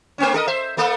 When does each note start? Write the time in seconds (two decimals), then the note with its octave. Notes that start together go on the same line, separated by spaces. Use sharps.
0.18 A3 C4 C#4
0.34 A4 A#4 D#5
0.47 C5 E5
0.77 A3 A#3 A4